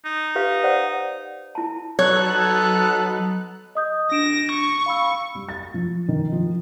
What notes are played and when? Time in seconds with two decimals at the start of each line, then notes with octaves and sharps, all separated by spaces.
0.05 D#4
0.35 G4 B4 F5
0.64 C5 D5 F#5
1.55 E4 A5
1.99 F#3 B3 D#4 A4 C#5 F#6
3.75 D#5 D#6 G6
4.11 D4 A#6 D7 E7
4.52 C#6
4.86 F5 B5 E6
5.35 G3
5.49 A6
5.74 F3
6.08 D#3
6.32 F3